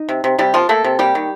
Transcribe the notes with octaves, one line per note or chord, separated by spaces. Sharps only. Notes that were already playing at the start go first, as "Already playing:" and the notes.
Already playing: D#4
C3
C3
C3 G3 G4
F3 A#3 F4
A3 A#3 A4
C3
G3 A#3 G4
D#3